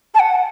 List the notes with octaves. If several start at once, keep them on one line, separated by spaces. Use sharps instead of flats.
A5
F#5